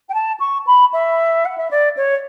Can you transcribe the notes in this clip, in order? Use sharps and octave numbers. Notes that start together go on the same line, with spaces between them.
G5
A5
C#6
B5
E5
F#5
E5
D5
C#5